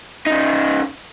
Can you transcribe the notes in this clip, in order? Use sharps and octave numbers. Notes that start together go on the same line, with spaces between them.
C#3 D#4